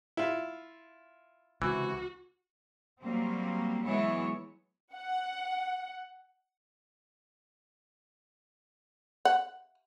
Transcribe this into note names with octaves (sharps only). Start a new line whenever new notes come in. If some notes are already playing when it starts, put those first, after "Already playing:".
E4 F4
C#2 C3 E3 F#4
F#3 G3 A#3 C4
E3 F#3 G#3 B3 E4 C#5
F#5
F#5